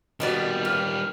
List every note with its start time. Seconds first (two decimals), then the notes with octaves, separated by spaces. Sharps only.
0.20 F2 B2 D#3 G3 D5
0.65 A#2 F6